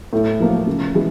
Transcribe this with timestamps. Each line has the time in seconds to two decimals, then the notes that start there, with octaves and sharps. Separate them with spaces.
0.13 A2
0.40 F3 A#3
0.67 C#3
0.95 E3 G#3